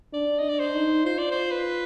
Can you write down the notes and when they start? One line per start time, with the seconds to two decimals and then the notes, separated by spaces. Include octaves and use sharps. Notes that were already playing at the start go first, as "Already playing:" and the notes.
0.13 D4 D5
0.38 D#5
0.44 D4
0.49 D5
0.59 C5
0.75 D#4
1.05 F4 C5
1.19 D5
1.31 C5
1.51 B4